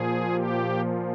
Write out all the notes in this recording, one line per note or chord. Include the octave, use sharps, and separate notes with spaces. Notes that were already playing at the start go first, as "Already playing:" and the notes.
Already playing: A#2 F3 G#4
G4